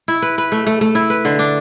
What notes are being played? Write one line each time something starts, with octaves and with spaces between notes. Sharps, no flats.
E4
B4
B4
A3
A3
A3
E4
B4
D3
D4